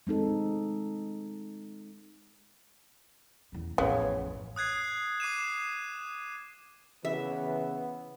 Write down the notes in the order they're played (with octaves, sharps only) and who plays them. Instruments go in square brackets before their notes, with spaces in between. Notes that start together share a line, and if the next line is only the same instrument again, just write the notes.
[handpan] G#3 C4 D#4 A4
[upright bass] E2 C#3
[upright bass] A1 F2 [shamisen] C#3 B3 [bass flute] C#5
[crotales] D#6 F#6 G#6 C7
D6 C7 D#7 E7
[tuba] C#3 [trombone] E3 [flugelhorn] B3 [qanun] E5